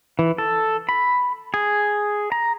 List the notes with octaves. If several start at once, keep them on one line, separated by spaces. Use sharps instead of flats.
E3
A4
B5
G#4
A#5